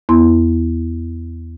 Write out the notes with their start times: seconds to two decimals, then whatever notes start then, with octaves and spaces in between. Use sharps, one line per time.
0.09 E2 B3 E4 C6